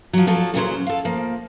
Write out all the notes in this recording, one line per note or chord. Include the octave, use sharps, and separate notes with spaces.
F3 F#3
F3 F#3 A4
A#2 C#3 F#3 C5
A4 F5
F3 A#3